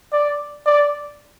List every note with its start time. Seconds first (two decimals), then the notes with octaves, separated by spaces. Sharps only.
0.13 D5
0.66 D5